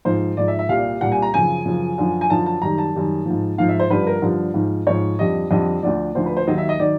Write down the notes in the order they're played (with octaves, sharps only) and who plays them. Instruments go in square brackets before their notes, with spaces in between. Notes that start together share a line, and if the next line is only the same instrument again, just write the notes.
[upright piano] G#2 F3 C5
G#2 F3 D5
E5
E5
C2 A#2 G3 F5
C2 A#2 G3 F#5
G#5
A#5
F#2 C#3 F3 G#5
F#2 C#3 F3
F#2 D3 F3
G#5
F#2 D3 F3 A5
A5
F#2 D#3 G3 A#5
A5
F#2 D#3 G3
G#2 F3
G#2 F3 F5
E5
C5
G2 D3 F3 B4
A#4
G2 D3 F3
G#2 F3
G#2 F3 C#5
F2 D3 G3 D#5
F2 D3 G3 D#5
D2 D3 F3 D5
D2 D3 F3 C5
B4
C5
D#2 D#3 F#3 D#5
E5
D#5
D#3 F#3 D5